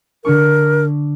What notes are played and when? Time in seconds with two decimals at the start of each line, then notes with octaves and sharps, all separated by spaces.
0.25 D3 D4 A#4 C#6